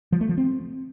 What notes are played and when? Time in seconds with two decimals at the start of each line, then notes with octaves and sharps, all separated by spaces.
0.12 F3
0.21 A3
0.29 F3
0.38 C4